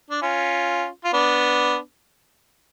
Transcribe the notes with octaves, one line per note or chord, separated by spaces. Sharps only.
D4
C#4 F4
F4
B3 D4